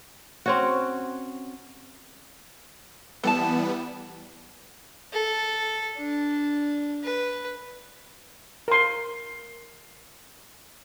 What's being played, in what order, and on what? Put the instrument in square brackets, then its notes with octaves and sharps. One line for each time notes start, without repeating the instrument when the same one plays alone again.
[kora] C4 C#4 F#4
[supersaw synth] E3 G3 B3 [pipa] A4 F#5 A5
[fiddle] A4
D4
B4
[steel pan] A#4 C6